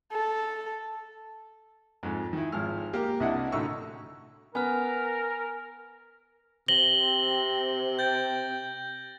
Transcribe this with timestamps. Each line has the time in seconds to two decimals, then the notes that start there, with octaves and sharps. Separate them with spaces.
0.12 A4
2.03 F2 G#2
2.33 D#3 E4
2.52 G#1 F3 G#3 F6
2.93 A#3 G4 A#4
3.20 C2 C3 D4 E4 D#5 F#5
3.52 A1 D3 D#4 F#4 C#6 E6
4.55 B3 A#4 G#5 F6
6.68 C3 A#6 F#7 G7
7.00 C4
7.99 G5 G6 A6